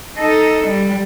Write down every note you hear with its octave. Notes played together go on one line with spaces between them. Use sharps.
D#4 A4
G3